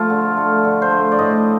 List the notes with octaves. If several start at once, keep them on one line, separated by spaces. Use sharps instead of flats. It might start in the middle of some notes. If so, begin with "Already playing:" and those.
Already playing: F3 A3 F4
D3
A3
D3
C5
A3
D5
A2 D#5